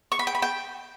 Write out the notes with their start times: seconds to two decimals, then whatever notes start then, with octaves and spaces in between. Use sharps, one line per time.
0.12 C#6
0.19 B5
0.27 G5
0.35 B5
0.42 G5